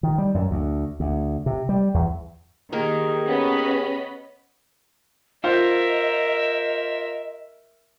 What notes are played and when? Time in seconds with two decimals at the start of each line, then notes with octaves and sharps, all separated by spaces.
0.03 D#3
0.18 G3
0.34 F#2
0.51 D2
1.00 D2
1.46 C3
1.69 G3
1.94 E2
2.72 D#3 A#3 D#4 G4 G#4 A#4
3.27 B3 C#4 D#5 B5
5.44 F4 A#4 C5 D#5 E5